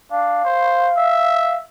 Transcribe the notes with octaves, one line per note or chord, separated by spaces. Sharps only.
D4 F5
C5
E5